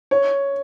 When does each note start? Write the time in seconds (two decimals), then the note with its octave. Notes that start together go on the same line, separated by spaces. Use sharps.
0.11 C#5